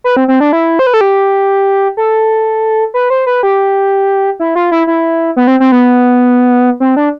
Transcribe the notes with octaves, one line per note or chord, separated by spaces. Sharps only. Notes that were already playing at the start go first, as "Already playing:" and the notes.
B4
C4
C4
D4
E4
C5
B4
A4
G4
A4
B4
C5
B4
G4
E4
F4
E4
E4
B3
C4
C4
B3
C4
D4